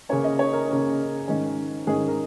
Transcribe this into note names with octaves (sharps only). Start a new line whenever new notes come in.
C#3 A#3 C#4 C#5
D#5
C#5
A#4
C#3 A#3 C#4
G#2 D#3 G#3 C#4
G#2 D#3 G#3 C#4 G#4
A#4